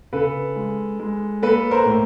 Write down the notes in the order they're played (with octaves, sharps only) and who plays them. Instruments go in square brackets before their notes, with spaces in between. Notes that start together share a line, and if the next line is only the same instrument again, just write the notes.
[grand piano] C#3 A4 B4
G#3
G#3
A#3 A4 B4
A#4 C5
A2